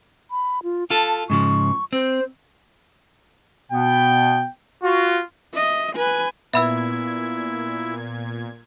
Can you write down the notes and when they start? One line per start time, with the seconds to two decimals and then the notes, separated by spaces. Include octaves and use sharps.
0.31 B5
0.63 F4
0.90 F4 A4 A5
1.30 G#2 C#3 F3 C#6
1.93 C4 C5
3.72 B2 B3 G5
4.84 F4 F#4
5.54 D#5 E5
5.96 B4 G#5
6.54 A#2 B3 E4 E5 B5 E6 G#6